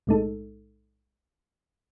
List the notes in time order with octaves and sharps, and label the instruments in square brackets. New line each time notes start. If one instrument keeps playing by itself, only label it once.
[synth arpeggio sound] B1 A2 G#3 D#4 A4